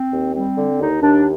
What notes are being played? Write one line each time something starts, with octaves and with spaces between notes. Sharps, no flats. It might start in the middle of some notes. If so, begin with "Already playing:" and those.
Already playing: C4
D#2
G3 C4
D3
D#2 D#4
D#2 D4